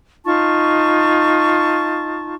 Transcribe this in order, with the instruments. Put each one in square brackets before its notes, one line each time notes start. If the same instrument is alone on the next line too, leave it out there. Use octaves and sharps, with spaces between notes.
[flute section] D#4 F4 A5 C#6